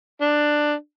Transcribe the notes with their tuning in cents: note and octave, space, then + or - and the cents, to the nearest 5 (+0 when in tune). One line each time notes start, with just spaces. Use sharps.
D4 +10